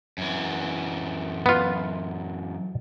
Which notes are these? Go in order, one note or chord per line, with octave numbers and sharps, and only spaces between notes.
F#2 E3
B3 F4